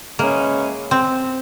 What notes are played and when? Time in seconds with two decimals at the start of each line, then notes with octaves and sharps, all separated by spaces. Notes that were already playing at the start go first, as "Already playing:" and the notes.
0.19 C#3 E3 G#3 A#3 C#4
0.91 C4